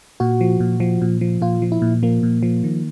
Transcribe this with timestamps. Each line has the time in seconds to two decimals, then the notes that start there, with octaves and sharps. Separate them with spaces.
0.20 A#2 F#4
0.41 F3
0.60 A#2
0.80 F3
1.02 A#2
1.21 F3
1.42 A#2 F4
1.62 F3
1.72 E4
1.82 A#2
2.03 F3 A#3
2.23 A#2
2.43 F3
2.64 D#3